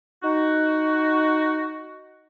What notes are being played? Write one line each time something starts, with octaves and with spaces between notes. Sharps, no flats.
D#4 F#4